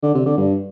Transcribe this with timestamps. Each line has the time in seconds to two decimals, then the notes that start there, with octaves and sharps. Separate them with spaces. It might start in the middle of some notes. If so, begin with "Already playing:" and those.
0.03 D3
0.15 C3
0.26 D3
0.38 G2